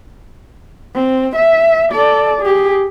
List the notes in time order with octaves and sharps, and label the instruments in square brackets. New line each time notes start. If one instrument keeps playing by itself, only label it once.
[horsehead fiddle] C4
E5
A4 D5
G4 G#4